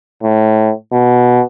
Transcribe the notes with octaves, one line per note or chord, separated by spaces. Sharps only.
A2
B2